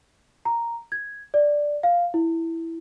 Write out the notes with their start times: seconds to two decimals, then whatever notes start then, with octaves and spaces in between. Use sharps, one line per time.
0.45 A#5
0.92 G#6
1.34 D5
1.83 F5
2.14 E4